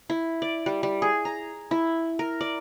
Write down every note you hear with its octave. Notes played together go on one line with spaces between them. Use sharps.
E4
D5
G3
G3
G#4
A#5
E4
A#4
D5